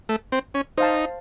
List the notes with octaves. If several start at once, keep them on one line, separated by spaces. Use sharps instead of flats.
A3
C4
C#4
D#4 C5 F5 A5